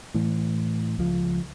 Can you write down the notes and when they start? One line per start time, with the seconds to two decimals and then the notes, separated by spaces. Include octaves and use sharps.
0.14 A2 E3
0.98 C#2 F3